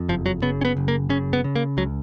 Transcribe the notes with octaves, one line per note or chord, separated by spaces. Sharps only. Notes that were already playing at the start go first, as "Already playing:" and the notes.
Already playing: F2
F#1 F3
F#3
C#3 B3
C#4
B3
F#1
A#3
C#3 C#4
B3
C#3
A#3
C#2 F#3